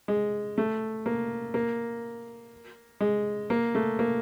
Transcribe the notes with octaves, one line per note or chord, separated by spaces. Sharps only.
G#3
A3
A#3
A#3
G#3
A#3
A3
A#3